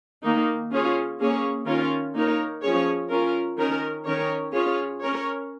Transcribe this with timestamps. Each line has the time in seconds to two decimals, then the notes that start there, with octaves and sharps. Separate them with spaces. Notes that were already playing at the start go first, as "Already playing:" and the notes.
0.23 D#3 A#3 D#4
0.71 C#4 F4 G#4 C#5
1.19 A#3 C#4 G#4 C#5
1.66 D#3 C#4 F4 A#4 C#5
2.14 A#3 D#4 A#4 C#5
2.62 F3 C#4 G#4 C#5
3.10 C#4 F4 A#4
3.58 D#3 C#4 A#4
4.05 D#3 C#4 A#4 C#5
4.53 C#4 F4 G#4 C#5
5.02 C#4 A#4 C#5